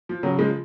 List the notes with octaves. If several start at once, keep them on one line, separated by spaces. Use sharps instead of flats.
F3
C#3 F#3
F3 G#3